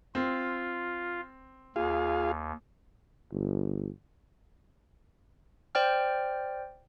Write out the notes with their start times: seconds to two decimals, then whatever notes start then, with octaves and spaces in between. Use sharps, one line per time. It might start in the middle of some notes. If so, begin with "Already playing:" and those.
0.15 C4 F4
1.76 D#2 F4 G#4 F5
3.32 G1
5.75 C5 D5 G5 F6